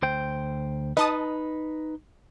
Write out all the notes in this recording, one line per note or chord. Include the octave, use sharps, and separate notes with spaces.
D2 C5 G5
D#4 B4 D#5 A5 D#6